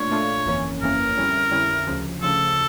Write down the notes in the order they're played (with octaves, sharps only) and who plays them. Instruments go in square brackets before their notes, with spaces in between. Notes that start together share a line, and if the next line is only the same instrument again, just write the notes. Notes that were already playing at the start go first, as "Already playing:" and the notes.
Already playing: [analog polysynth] A#2 A3 D4 F4 [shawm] C#5
[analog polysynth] A#2 A3 D4 F4
G1 F2 E3 A#3 C#4
[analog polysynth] G1 F2 E3 A#3 C#4 [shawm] A#4
[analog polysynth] F2 D3 G3 C#4 E4
F2 D3 G3 C#4 E4
D2 C#3 F3
[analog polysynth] D2 C#3 F3 [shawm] A4